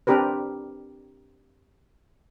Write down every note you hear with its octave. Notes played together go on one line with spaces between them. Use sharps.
C4 D4 G4 A#4 B4